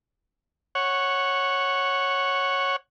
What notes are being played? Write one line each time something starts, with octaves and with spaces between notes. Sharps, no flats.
C#5 F#5